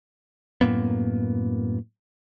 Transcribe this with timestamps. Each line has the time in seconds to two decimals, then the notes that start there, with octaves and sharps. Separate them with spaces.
0.61 F#2 A2 A#3 B3